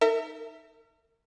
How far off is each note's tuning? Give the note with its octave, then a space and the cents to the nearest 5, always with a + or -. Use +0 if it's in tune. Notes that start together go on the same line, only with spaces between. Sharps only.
D#4 +0 A#4 -40 E5 +0